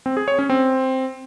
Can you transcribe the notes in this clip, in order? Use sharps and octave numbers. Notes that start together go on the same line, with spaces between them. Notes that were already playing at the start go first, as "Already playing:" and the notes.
C4
G#4
C#5
C#4
C4